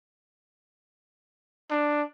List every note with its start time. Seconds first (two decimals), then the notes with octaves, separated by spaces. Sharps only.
1.70 D4